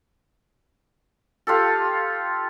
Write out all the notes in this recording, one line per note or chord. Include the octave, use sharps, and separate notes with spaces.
F4 G4 A4